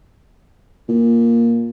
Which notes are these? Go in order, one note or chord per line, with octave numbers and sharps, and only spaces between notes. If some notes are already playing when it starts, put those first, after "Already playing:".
A#2